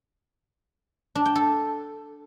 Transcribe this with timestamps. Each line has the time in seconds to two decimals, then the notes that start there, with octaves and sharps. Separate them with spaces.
1.15 D4
1.25 G5
1.35 A4